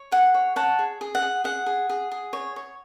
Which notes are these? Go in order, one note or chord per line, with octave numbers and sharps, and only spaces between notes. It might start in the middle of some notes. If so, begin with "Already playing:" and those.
Already playing: C#5
G#4 F#5
C#5
C#5 F#5 A5
G#4
G#4
F#5
G#4
G#4 F#5
G#4
G#4
G#4
C#5
C#5